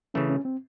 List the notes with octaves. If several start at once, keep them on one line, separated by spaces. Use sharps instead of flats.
C#3 E3 A3 C#4
C#4
C4